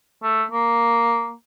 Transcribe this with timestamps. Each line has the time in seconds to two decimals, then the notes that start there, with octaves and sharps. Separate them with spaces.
0.23 A3
0.51 A#3